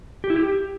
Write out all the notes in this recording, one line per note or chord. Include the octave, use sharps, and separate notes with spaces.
G4
E4
G4